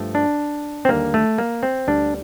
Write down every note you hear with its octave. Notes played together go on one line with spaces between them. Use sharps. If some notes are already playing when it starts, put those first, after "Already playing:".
Already playing: G2 F3 A3
D4
C4
D#2 D3 G3 A#3
A3
A#3
C4
D2 D3 G3 D4